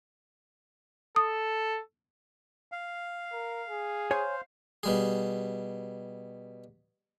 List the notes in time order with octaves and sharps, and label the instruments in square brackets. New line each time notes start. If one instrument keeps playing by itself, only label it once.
[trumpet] A4 [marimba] D#6
[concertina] F5
[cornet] A#4
G#4
[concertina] C5 F5 [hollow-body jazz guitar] C#5 G#5
[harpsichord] B2 G3 G#4